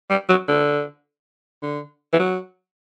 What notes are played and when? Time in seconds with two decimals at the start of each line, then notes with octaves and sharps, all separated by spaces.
0.10 G3
0.29 F#3
0.48 D3
1.62 D3
2.13 E3
2.19 F#3